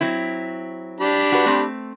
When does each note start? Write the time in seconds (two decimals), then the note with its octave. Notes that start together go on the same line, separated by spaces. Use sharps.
0.01 F#3 C4 E4
1.01 D4 G4 B5
1.32 F#4 B4
1.46 A3 C4